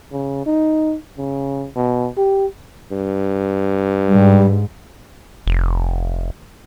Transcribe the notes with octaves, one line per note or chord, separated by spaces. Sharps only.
C#3
D#4
C#3
B2
G4
G2
G#2 G3
F1